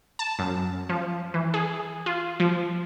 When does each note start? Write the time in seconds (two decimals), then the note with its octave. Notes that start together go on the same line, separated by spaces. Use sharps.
0.19 A5
0.39 F#2
0.89 F3
1.34 E3
1.54 G#4
2.06 F4
2.40 F3